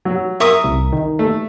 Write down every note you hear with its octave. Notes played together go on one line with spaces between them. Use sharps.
F#3
A#4 E5 C#6 D#6
C2
D#3
A3